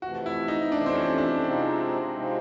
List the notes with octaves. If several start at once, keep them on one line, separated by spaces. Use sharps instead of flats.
F2 C3 E3 A3 F#4
E4
D#4
F2 C3 E3 A3 D4
C4
C#4
D4
C3 F3 G#3 C4 D#4
C3 F3 G#3 C4 D#4